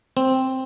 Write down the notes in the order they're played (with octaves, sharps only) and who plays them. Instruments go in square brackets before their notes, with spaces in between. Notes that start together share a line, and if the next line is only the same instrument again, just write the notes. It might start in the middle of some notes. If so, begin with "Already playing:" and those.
[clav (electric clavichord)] C4